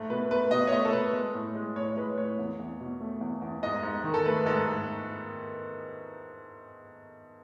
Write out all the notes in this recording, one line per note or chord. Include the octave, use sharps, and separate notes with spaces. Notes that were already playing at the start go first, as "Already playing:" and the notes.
Already playing: G#2 A3
B2 B4
A3 B4
B2 D#5
C#5
A3 D#5
A4
B2 B4
G#3
A2
G#3
A2 C#5
C#5
G#3 B4
A2 C#5
E2
E2
B2
A3
E2
E2
G#2 D#5
G#2
D#3
A4
A3 B4
G#2 A4
G#2